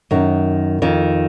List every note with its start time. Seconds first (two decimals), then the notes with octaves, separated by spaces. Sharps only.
0.11 F#2 D#3
0.82 F2 D#3